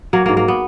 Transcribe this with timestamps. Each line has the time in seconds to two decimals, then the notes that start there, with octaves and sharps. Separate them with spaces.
0.13 F#3 A#3
0.26 G#2 A#3
0.37 A#3
0.48 B3